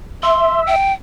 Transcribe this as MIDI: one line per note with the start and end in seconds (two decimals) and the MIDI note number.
0.23 0.76 76
0.23 0.61 84
0.67 0.93 79